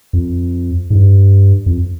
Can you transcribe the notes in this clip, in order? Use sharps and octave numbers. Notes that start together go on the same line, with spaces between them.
F2
G#2
G2
F2